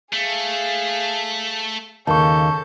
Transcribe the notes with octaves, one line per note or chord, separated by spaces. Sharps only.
A3 G#4 F5
D#2 C#3 A4 A5 C#6 G6